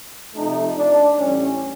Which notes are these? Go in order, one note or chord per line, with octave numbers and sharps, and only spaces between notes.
C3 F3 A3 D#4
D4
A2 E3 G3 C#4